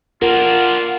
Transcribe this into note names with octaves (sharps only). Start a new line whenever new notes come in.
A#3 D4 F4 A#4 F#5